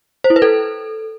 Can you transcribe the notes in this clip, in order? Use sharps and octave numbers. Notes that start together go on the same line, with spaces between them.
C5
E4
B4
A4